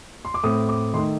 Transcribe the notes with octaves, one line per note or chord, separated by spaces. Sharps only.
C6
D6
A2 A3 C4 D#6
D6
D#3 A3 D#4 C6